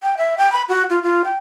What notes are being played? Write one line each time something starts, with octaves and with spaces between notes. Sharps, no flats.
G5
E5
G5
B5
F#4
F4
F4
G5